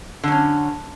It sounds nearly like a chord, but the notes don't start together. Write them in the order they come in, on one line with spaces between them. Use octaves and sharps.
D3 F#3 C#4